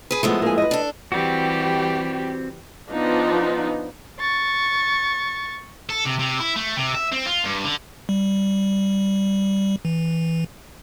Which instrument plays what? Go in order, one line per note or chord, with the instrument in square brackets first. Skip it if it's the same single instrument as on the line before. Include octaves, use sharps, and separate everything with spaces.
[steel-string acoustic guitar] G#4 B4
[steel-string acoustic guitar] F3 G#3 E4 [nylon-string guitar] A3 B3
[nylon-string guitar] A#3 G#4
B4 D#5
[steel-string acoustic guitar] D4 A4
[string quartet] E3 G3 G4 [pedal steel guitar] C4 F#4
[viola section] F3 B3 D4 D#4 F4
[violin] C#6 A6
[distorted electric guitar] A4
C3
C3
E4
A3
C3
E5
C4
F4
G2
D3
[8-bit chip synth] G3
E3